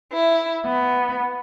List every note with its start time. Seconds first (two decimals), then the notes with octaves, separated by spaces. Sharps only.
0.14 E4
0.66 B3